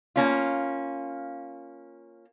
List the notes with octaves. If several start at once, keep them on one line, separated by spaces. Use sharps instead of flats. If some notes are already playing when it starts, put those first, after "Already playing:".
A#3 C#4 F4